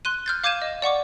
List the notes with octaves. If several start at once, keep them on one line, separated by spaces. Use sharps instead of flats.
C6 F#6 D#7
F6 G6 A6
F5 D6 G6 G#6 D#7 E7
D#5
D5 F#5 C#6 D6